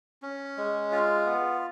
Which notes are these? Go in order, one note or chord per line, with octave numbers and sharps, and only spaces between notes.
C#4
G#3
F4
B3